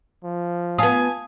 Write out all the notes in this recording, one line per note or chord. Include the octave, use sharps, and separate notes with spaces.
F3
B3 F4 F5 G#5 A5 D#6